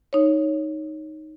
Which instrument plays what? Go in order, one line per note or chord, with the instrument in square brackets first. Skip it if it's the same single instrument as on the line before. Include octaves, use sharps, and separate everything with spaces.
[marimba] D#4 C#5